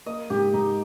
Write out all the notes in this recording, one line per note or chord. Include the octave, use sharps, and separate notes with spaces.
A#3 D#5
G#2 G4
G#2 D#4